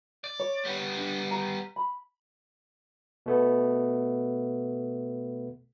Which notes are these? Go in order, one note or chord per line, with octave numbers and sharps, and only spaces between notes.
D5
C#5
G3 B3
D4
A#5
B5
B2 A3 B3